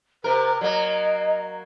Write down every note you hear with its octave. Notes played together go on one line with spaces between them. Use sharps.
C3 A#4 C5
F#3 A#3 D#5